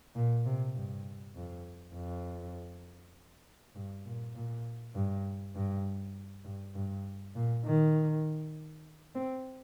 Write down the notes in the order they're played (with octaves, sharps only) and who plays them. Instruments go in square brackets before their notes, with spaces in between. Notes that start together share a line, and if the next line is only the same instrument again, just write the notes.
[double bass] A#2
C3
G2
F2
F2
G2
A#2
A#2
G2
G2
G2
G2
A#2
D#3
C4